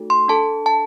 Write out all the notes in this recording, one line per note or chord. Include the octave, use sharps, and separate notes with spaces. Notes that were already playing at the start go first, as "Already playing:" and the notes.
Already playing: A3 D#4 F#4 A4
C6
D4 A4 A5
A5